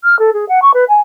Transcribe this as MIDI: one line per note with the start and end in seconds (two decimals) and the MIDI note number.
0.04 0.18 89
0.19 0.30 69
0.33 0.47 68
0.49 0.60 78
0.62 0.71 85
0.74 0.84 71
0.88 1.00 80